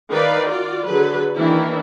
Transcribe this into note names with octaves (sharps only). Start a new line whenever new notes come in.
D#3 B4 D5 F5
F4 F#4 D5
D3 F#3 G#4 A4 B4
D#3 E3 A#3 D4 E4